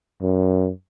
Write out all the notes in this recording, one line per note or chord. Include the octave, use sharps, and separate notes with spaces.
F#2